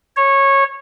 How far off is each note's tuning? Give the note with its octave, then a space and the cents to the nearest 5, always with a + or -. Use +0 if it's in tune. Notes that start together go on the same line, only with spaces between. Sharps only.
C#5 -15